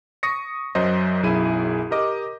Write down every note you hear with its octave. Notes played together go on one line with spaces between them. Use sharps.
C#6 D#6 A#6 C#7
F#2 F#3 C5 D#5
B1 F#2 E4 G#4 D#7
G4 A#4 D#5 D6